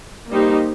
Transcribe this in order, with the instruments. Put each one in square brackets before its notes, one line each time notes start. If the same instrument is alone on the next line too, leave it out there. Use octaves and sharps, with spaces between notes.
[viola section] G3 A#3 D#4 G4 C5